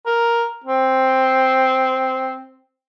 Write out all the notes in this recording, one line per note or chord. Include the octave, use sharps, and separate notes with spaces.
A#4
C4